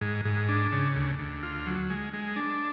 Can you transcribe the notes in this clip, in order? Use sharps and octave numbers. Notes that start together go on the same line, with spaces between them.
G#2
G#2
D4
C#3
D2
D2
F4
F#3
G#3
G#3
D4